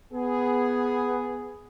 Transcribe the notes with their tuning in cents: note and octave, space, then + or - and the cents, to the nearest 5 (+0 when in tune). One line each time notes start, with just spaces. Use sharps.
B3 +5 G#4 +0